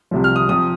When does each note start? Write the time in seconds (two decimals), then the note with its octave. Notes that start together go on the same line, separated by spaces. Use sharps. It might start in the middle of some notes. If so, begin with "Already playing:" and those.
0.11 C2 C3 F3
0.24 F6
0.36 D#6
0.49 C3 F3 D#6